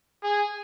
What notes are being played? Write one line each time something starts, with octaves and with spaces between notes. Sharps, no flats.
G#4